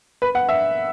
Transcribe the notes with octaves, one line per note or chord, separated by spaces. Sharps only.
B4
F#5
E5